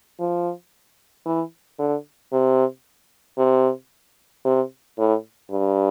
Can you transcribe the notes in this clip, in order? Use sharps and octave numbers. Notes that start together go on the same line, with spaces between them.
F3
E3
D3
C3
C3
C3
A2
G2